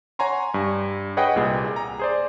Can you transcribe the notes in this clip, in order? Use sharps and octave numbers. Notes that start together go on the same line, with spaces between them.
C#5 F#5 G#5 A#5 C6
G2
G#4 B4 C#5 D#5 F#5 G5
C2 A#2 G#4
A#5
G#4 C5 D5